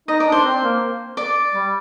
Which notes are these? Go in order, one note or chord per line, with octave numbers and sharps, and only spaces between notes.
D#4 D#5
D5
D4
C5
C4
A#3
D5
G3